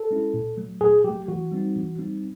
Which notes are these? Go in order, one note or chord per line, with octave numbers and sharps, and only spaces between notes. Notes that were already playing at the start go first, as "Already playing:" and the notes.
Already playing: A4
G#3 C#4 E4
A#2
F#3 A3
A#2 G#4
F#3 A3 G4
E3 F#4
G3 C4 D#4
E3
G3 C4 D#4